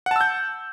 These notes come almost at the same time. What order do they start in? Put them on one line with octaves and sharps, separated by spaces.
F#5 A5 E6 G6